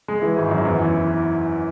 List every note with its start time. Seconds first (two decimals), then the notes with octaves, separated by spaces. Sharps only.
0.08 G#3
0.22 E3
0.37 G#1
0.51 F#2
0.65 E2
0.79 E3